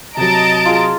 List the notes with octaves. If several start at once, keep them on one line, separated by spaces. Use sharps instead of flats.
C3 F#3 D#5 A5 A#5 D7
F4 G#4